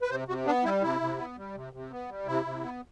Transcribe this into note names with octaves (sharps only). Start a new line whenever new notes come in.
B4
C3 C5
C3 F#4
B3 D4
G3 E4
C3 E4
C3
B3
G3
C3
C3
B3
G3
C3 E4
C3
B3